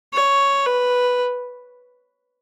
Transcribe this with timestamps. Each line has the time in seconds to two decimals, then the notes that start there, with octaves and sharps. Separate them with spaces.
0.13 C#5
0.66 B4